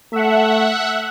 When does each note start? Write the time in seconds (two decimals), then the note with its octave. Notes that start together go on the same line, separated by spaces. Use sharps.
0.13 A3 E5 F#5